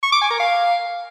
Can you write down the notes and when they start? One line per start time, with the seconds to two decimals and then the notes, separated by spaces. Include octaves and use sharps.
0.03 C#6
0.12 D6
0.21 G#5
0.30 A#4
0.40 F5